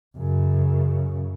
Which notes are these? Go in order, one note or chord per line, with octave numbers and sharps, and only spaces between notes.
F#2 C#3